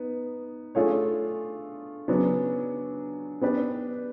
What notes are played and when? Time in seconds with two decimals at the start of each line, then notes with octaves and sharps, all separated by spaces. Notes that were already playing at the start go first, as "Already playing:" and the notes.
Already playing: B3 D#4
0.75 A3 D4 F4 G#4 C#5
2.08 C#3 F#3 B3 D4
3.41 B3 D4 G4 B4 D5